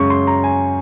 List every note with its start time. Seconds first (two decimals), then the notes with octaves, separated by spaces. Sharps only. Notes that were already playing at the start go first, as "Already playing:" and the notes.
Already playing: F#2 C#3 G#3 C#6
0.10 C6
0.27 A#5
0.44 G#5